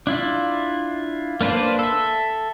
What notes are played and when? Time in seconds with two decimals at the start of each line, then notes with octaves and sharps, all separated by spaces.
0.07 D4 E4 F4
1.41 A#3 D4 B4 C5 D5
1.79 A4 E5